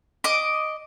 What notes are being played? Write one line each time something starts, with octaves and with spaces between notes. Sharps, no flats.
D#5 D6